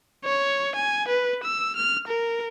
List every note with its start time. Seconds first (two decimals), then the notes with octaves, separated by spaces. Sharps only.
0.24 C#5
0.76 G#5
1.08 B4
1.43 E6
1.76 F6
2.08 A#4